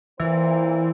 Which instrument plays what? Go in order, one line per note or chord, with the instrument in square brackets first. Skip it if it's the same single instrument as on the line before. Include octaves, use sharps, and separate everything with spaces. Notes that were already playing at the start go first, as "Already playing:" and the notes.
[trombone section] A#2 C4 C5 [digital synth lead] E3